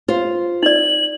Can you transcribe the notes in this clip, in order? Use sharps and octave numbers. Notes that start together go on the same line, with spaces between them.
F4 C5
D#4 D5 F#7